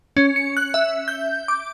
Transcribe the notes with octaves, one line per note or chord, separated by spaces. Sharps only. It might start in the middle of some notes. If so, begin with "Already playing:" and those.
C#4
C#7
F#6
E5
G6
D6